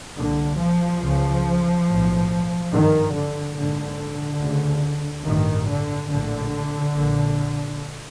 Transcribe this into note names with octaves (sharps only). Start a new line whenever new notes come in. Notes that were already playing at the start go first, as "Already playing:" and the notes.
C2 A#2 D3
F3
C#2 C#3
B1 A2
G#1 G2 D#3
D3
A#1 G#2 D3
D2 C#3
A1 G2 D#3
D3
A#1 A2 D3
A#1 A#2